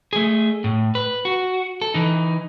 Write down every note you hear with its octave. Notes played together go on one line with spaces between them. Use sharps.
A3 G#4
A2
B4
F#4
A4
E3 D#4